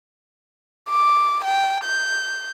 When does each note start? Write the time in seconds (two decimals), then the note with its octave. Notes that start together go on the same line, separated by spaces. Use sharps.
0.89 D6
1.45 G5
1.84 G6